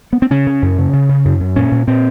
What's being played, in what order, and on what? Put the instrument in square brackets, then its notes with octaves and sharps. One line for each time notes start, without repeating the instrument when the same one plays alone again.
[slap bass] B3
C4
C#3 C#4
C#3
F#2
C#3
C#3
C#3
F#2
F#2
A#2 C#4
A#2
A#2 C4